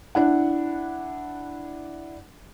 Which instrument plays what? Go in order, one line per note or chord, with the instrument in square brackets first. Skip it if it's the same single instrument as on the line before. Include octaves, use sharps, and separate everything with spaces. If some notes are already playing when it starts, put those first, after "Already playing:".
[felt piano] D4 E4 F#5